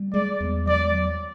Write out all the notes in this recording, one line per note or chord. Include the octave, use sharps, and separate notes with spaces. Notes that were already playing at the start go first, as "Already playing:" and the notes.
Already playing: G3
G#3 D5
E2
F#3 D5
F#3